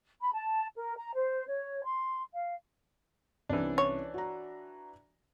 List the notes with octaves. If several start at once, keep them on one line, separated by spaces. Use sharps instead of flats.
B5
A5
A#4
A#5
C5
C#5
C6
F5
C2 E3 C#4 D4
C#5
F#4 A#5